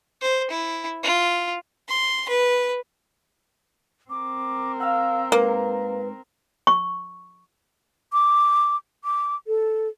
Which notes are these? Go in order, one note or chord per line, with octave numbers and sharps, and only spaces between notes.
C5
E4
F4
C6
B4
C4 A#4 D6
F5 F#5 E6
G#2 A#3 B4
C#6
D6
D6
A4